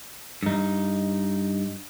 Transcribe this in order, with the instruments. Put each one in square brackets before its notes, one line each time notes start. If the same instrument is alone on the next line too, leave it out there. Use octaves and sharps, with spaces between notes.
[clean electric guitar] G2 D#4